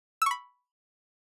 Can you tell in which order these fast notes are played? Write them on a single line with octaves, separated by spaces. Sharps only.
E6 C#6 B5